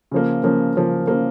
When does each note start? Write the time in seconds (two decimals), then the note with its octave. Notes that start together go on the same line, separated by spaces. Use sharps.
0.12 C#3 F3 A#3
0.44 C#3 F3 A#3
0.76 C#3 F3 A#3
1.07 C#3 F3 A#3